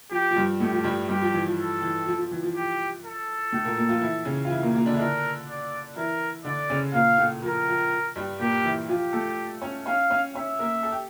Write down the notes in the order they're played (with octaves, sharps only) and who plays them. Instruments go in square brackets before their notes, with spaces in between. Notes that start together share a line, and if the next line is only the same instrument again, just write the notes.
[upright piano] F3 [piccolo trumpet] G4
[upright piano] F3
G2 G3
[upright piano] A2 A3 [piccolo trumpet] G4
[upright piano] F3
G2 G3
[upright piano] G2 G3 [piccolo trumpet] G4
[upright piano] F3
E3
F3
[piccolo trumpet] A4
[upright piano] E3
F3
F3
E3
F3
[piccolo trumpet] G4
A4
[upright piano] A2 A3
A#2 A#3
A#2 A#3
F3 F4
E3 E4
C#3 C#4
F4
E3 E4
A#2 A#3
A#2 A#3
D3 D4
E4
[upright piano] D3 D4 [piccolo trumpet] A#4
[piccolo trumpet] D5
[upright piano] E3 E4 [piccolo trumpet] A#4
[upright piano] D3 D4 [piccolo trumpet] D5
[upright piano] C#3 C#4
[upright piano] A#2 A#3 [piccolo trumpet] F5
[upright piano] A2 A3
[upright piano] F3 [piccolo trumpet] A#4
[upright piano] F3
G2 G3
[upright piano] A#2 A#3 [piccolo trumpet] G4
[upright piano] E3 E4
[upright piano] F3 F4 [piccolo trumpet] G4
[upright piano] A3 A4
C#4 C#5
[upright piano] C#4 C#5 [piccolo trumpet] F5
[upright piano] C#4 C#5
[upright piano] C#4 C#5 [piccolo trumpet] E5
[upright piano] A#3 A#4
A4
G4